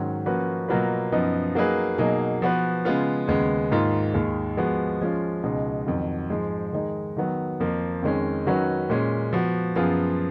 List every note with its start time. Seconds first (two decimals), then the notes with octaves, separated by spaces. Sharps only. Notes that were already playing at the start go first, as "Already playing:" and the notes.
Already playing: G#2 D#3 F#3 C#4
0.26 F3 A#3 C#4 F#4 B4
0.69 B2 F#3 A#3 F4 B4
1.12 F#2 F3 B3 D#4
1.55 F#3 A#3 D#4 G#4 B4
1.98 B2 F#3 A#3 D#4 G#4
2.42 F3 B3 F#4 B4
2.85 C#3 G#3 B3 F4
3.28 D#2 C#3 G#3 B3
3.71 G#2 D#3 A#3 F4
4.14 D#2 D#3 G#3
4.57 F3 G#3 B3 F#4
5.01 F3 G#3 C#4 F4
5.43 C#2 B2 G#3 D#4
5.86 F2 D#3 F#3
6.30 G#2 F3 G#3
6.73 D#3 G#3 D#4
7.17 D#3 F#3 B3
7.60 F2 F3 A#3
8.02 F2 D#3 G#3 C#4
8.46 D#3 F#3 C#4 F#4 B4
8.90 A#2 G#3 C#4
9.33 F3 B3 F#4
9.76 F#2 F3 B3 F4 G#4